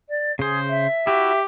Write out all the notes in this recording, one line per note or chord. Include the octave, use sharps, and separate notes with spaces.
D5
C#3 G#4 C5
E5
E4 F#4 G4